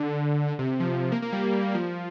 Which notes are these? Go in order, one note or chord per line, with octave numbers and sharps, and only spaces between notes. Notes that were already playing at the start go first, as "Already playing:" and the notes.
Already playing: D3
D3
C3
C3
F3
A#3
A#3
G3
F3